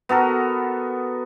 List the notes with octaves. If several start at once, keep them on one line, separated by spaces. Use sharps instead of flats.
B3 F#4 A4 A#4